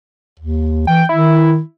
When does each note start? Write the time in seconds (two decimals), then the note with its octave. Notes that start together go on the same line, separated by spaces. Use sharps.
0.39 D#2
0.87 E3 G5
1.09 D#3 E4